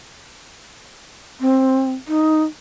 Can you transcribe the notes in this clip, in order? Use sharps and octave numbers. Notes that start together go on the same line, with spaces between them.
C4
D#4